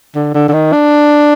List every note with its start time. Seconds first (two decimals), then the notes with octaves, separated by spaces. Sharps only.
0.15 D3
0.34 D3
0.48 D3
0.53 D#3
0.72 D4